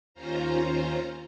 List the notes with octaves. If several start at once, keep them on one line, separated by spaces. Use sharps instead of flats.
D#2 C#4 F4 C5 A#5